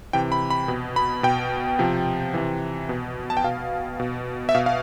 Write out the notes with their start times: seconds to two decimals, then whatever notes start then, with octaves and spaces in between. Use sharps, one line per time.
0.13 C3 E3 G5
0.32 B5
0.50 B5
0.68 B2
0.96 B5
1.23 B2 G5
1.79 C3 F3
2.34 C3 E3
2.89 B2
3.30 A5
3.37 G5
3.44 B2 F5
4.00 B2
4.49 E5
4.55 B2 F5
4.66 F5